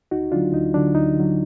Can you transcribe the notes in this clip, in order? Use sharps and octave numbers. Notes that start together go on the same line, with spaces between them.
D2 D#4 F#4
D3 F#3 D4 F4
D2 D#4
D3 F#3 D4
D2 D#4
D3 F#3